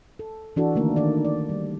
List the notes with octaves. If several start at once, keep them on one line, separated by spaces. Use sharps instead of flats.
A4
E3 D4 F#4 A4
D3 D#3 A3 A#3 A#4
D#3 D4 A4 D5
D5
G3